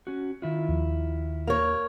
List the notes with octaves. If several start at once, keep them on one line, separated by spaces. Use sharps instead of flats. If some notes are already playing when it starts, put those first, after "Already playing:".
C#4 F#4
D#3 E4 F4
D#2 F3
A#3 C#5